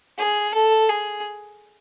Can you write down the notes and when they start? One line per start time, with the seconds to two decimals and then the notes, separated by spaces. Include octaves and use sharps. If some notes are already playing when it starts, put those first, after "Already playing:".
0.18 G#4
0.54 A4
0.89 G#4